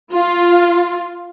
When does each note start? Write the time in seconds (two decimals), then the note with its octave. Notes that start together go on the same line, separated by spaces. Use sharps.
0.13 F4